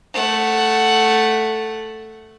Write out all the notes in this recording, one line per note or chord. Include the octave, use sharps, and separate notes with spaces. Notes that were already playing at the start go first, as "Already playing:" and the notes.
A3 F#5